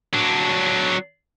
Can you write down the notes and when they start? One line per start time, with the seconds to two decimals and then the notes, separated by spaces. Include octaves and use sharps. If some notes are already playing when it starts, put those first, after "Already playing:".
0.14 F#3 D4